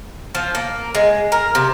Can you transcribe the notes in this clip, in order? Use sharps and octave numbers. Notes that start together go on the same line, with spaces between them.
F3
A#3
G#3
A#4
C3